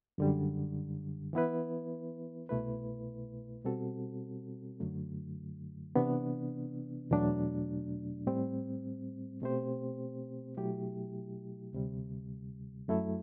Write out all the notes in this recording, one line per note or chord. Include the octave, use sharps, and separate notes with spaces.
F#2 D3 G3
E3 B3 E4 B4
C2 B2 A3 E4 B4
B2 G3 C4 F#4 A4
F#2 D3 F#3 A3
C3 E3 B3 D4
E2 B2 F#3 A3 D4
A2 G3 C4
B2 A3 C4 G4 C5
B2 F#3 A3 E4 G4
D2 C3 G3
F#2 F#3 A3 E4 A4